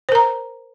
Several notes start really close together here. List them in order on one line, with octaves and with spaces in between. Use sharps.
C5 A#4 A#5